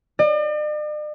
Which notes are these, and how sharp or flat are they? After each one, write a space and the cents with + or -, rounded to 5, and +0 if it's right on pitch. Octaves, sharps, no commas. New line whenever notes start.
D5 +45